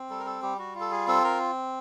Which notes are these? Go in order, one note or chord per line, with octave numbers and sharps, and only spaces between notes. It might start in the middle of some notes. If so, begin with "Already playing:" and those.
Already playing: C4
G3 A4
A#4
A4
G3 G4
F#4
F4
A4
G#4
C4 A4
A#4